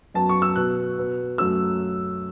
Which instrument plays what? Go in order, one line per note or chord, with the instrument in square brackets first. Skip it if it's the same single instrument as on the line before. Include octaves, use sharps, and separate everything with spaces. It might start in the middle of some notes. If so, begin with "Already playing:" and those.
[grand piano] F#2 F#3 B3 A5
C#6
E6
B2 B3 F#6
B2 B3
F#2 F#3 A3 C#4 E6